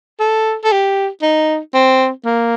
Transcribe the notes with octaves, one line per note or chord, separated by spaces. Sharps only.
A4
A4
G4
D#4
C4
A#3